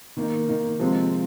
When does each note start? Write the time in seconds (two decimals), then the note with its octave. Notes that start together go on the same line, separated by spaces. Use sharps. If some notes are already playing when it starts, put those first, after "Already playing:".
0.17 D#3 A#3 D#4
0.48 D#3 A#3 D#4
0.80 C3 F3 G#3 C4